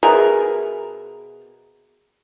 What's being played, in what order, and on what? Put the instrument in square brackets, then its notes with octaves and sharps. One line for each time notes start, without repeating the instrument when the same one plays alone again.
[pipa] B2 G#4 A#4 E5